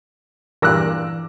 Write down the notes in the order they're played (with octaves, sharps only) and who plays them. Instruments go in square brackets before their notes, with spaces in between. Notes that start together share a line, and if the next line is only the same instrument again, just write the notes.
[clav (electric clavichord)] G2 A#2 [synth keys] E3 [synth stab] A#4 F#6 [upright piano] D6 E6 A#6